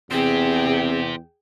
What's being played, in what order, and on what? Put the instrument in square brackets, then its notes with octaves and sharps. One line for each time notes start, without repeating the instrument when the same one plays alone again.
[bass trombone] E2 [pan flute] C4 [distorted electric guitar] G4 C5 [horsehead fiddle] G#4 G5